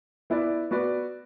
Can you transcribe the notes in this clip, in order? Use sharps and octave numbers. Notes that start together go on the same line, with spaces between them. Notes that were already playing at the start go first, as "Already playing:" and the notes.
B3 E4 B4 D5
B3 F#4 B4 D5